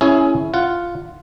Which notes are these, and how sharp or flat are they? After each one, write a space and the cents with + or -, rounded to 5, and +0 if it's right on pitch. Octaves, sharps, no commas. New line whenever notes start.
C#4 +0 E4 +0 G#4 +20
F4 -5 F#5 +0